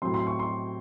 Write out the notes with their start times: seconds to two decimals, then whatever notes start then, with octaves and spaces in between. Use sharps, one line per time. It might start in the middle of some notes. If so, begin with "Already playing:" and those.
0.02 A2 F#3 C4 C6
0.14 C6
0.27 C#6
0.39 C6